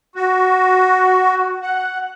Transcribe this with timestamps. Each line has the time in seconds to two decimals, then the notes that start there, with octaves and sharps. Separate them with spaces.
0.16 F#4
1.63 F#5